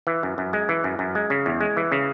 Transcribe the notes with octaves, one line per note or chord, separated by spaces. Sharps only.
E3
F#2
F#2
G#3
E3
F#2
F#2
G#3
C#3
E2
G#3
E3
C#3